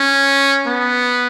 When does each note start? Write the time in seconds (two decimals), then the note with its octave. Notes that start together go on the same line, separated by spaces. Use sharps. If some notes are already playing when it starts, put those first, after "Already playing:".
Already playing: C#4
0.66 B3